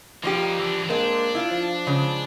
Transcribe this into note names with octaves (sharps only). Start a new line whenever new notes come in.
F3 G3 A#3 D#4 G4
E3 D4
G#3 A#3 C4 D4
E4 F4
F3
C#3 G#3